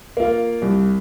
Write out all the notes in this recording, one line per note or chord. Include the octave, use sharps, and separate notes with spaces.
A#3 F4
C2